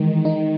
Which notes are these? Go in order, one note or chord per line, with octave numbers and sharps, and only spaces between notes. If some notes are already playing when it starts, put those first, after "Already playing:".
Already playing: D#3 E3 G#3
D#4